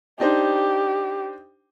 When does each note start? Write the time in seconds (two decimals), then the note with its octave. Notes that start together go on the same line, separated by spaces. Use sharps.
0.20 D4 D#4 G4 C5